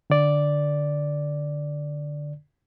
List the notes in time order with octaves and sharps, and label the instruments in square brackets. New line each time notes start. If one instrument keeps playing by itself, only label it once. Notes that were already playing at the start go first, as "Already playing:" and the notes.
[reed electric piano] D3 D5